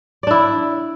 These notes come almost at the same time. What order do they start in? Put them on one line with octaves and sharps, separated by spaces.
D5 D4 E4